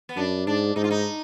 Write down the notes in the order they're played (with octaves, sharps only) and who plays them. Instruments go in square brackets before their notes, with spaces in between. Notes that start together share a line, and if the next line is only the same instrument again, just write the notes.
[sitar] B3
[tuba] F#2 [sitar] D4
[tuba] G#2 [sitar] D4
[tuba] G#2 [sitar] D#4
[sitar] F4
D#4